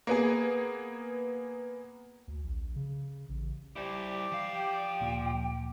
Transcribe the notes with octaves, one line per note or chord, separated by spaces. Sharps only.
A#3 B3 G#4
D2
A#1
C#3
A1
E4 G4 C5 D5
F3 F5
G5
D2 A#2 D6